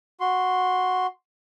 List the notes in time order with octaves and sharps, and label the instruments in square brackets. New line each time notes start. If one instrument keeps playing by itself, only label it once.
[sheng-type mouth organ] F#4 C6